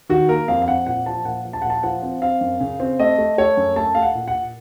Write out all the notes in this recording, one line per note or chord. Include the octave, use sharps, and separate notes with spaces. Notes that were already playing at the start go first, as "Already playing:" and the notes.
D#3 F#4
A#3 A#4
F2 F5
F5
C4 F#5
A#2 F#5
F3 A5
A#2 F#5
F3
A5
A#2 F#5
A5
F3 F#5
C4
C4 F5
F#2
C#3
C4
A3 D#5
A3
A3 C#5
F#2
A3 A5
A3 F5
F#5
A#2
F#5
A#2